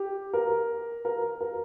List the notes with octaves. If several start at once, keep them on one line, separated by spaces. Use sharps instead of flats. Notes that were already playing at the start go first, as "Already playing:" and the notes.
Already playing: G4
A#4
A#4
A#4